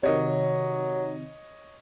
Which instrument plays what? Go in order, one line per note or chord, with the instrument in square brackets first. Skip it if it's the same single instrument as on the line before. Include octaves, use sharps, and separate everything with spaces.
[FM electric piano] C3 D#3 [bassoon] F#3 [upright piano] C#5 D#5